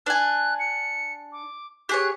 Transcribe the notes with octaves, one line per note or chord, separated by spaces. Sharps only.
D4 G#5 F#6
C#7
D6
G4 G#4 C#5 F#6